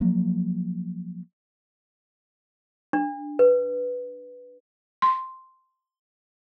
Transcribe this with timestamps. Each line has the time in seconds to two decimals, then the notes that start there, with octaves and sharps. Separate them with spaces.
0.01 F3 F#3 A#3
2.93 D4
3.39 B4
5.02 C6